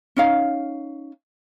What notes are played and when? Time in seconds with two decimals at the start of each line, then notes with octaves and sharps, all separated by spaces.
0.17 C#4 D#4 F5